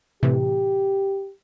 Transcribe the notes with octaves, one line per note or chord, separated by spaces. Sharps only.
A2 C3 E3 G4